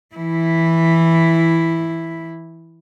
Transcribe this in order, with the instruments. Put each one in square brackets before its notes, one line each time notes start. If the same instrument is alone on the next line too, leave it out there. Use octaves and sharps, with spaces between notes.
[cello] E3 E4